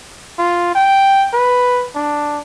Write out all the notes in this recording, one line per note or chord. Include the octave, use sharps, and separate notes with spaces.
F4
G5
B4
D4